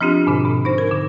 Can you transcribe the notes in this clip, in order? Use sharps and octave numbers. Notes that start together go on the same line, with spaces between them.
F3 C4 D4 F4 G4
G#2 B2 D3
B2
D#4 C5
A#4
D3